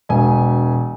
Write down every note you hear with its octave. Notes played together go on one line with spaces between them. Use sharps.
E1 G#5